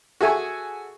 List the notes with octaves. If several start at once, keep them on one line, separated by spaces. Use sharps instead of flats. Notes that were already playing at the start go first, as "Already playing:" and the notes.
F#4 G#4 A4 E5 G#5 C#6